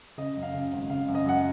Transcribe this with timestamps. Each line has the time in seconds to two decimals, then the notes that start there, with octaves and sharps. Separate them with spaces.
0.18 C#3 D#5
0.37 F#2
0.43 F5
0.54 C#3
0.72 G#1
0.90 C#3 F5
1.08 F#2
1.15 D#5
1.26 F#2 F#5